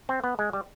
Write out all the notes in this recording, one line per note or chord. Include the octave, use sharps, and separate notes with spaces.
C4
B3
G#3
G3